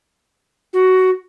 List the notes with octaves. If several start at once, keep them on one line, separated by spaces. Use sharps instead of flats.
F#4